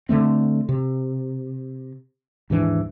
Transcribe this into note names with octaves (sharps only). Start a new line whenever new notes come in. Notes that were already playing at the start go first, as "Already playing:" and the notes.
D3 E3 A3 C4
C3
D#2 G#2 E3 D4